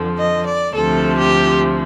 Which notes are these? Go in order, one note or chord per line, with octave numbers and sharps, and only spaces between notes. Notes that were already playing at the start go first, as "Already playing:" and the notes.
Already playing: F2 D3 F3
D#5
D5
D2 C3 F3 A4
G4